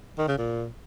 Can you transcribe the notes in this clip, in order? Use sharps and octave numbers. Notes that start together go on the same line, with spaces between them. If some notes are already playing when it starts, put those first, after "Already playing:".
D#3
C#3
A#2